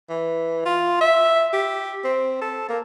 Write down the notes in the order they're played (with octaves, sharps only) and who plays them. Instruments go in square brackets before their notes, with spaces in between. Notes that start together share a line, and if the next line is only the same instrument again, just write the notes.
[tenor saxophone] E3
F4
E5
G4
C4
A4
A#3